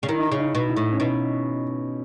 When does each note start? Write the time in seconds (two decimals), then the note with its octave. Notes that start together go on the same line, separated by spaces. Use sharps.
0.03 C#3
0.08 D#3 E4
0.18 D#4
0.27 E4
0.32 C#3
0.39 D#4
0.55 B2
0.69 E4
0.76 A2
0.92 C#4
1.00 B2 D#4